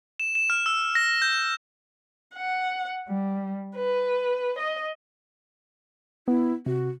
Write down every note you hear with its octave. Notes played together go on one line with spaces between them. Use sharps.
E7
E7
F6
E6
A#6
G6
F#5
G3
B4
D#5
B3 E4
C3 F#4